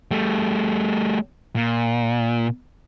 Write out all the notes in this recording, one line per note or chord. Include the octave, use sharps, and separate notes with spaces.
G3 A3
A#2